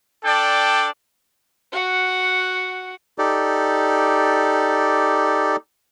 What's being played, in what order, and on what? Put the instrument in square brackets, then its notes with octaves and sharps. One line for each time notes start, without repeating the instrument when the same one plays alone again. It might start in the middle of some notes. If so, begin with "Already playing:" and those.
[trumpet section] D4 A4 D5 G5
[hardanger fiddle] F#4 F#5
[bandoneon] D#4 G4 A4 D5